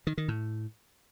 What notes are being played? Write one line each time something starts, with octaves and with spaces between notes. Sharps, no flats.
D#3
D#3
A2